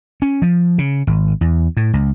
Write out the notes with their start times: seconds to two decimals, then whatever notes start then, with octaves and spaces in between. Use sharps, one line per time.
0.22 C#4
0.42 F3
0.78 C#3
1.07 G#1
1.41 E2
1.77 A2
1.94 C#2